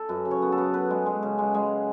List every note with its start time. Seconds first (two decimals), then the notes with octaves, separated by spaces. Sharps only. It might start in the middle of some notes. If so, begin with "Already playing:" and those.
Already playing: A4
0.09 F#2 B4
0.25 C#3
0.31 C#5
0.42 B3
0.52 A4
0.58 B3
0.73 B3 B4
0.90 G#3
1.06 G#3
1.23 C#3
1.38 G#3
1.54 G#3